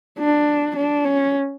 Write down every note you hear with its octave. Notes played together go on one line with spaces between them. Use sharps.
D4
D4
C#4